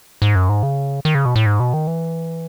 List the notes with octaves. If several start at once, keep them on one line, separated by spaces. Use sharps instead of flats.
G#2
F#2
G#2
C#3
D#3
C#3
B2
A2
G#2
B2
D#3
E3